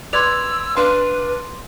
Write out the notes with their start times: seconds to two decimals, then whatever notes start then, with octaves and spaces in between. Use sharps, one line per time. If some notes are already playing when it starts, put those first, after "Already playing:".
0.13 B4 D5 C6 E6 G#6 F7
0.77 D4 B4 F5 C6